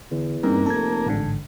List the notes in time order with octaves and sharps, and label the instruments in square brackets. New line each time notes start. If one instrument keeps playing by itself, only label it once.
[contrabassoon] E2 [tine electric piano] D3
[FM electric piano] G2 [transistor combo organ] A#3 [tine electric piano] C4 C#4 D#4
[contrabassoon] F1 [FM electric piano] A4 [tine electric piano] A5 G#6
[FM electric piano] A1 G#2 D3